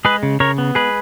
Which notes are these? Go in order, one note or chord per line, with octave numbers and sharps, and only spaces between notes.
G#3 G#4 B4
C#3
C#3 A#4 C#5
B3
G#3 G#4 B4